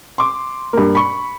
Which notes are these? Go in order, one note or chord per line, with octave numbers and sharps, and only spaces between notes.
C6 D6
G2 A#3
B5 C#6